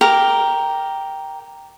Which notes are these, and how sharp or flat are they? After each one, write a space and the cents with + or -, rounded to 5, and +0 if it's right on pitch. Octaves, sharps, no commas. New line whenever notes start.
G4 +0 A#4 +0